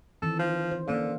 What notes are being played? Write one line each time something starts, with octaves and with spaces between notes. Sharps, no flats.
D#3 E3 C4 A4
F3
C5
D3 A#3 C#4 F5